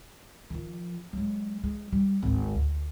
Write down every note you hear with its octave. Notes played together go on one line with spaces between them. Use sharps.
D#3 F3
F#3 G#3
G#3
G3
G#1 D2
D2